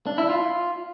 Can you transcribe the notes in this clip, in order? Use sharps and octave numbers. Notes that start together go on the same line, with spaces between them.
D4
E4
F4